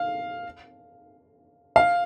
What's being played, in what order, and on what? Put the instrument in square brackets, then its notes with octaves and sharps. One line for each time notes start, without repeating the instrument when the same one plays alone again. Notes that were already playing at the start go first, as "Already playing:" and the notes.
Already playing: [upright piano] F5
F5